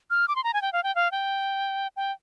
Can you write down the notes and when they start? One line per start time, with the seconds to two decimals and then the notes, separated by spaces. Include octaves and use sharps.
0.10 F6
0.28 D6
0.36 C6
0.44 A#5
0.53 G#5
0.62 G5
0.73 F5
0.84 G5
0.95 F5
1.12 G5
1.97 G5